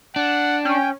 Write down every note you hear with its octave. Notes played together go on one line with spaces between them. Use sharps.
D4 F#5
C#4 G5